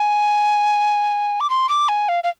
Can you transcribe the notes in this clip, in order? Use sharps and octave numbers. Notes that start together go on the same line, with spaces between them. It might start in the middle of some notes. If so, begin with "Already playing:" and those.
Already playing: G#5
D6
C6
D6
G#5
F5
F5